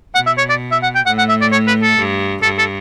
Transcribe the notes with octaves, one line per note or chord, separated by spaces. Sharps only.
B2 F#5
E5
C#5
D5
E5
F#5
G5
A2 F#5
F#5
E5
D5
C#5
B4
A4
G2
G2 A4
A4